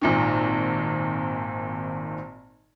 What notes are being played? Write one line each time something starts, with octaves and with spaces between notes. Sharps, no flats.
G#1 A#2 D#3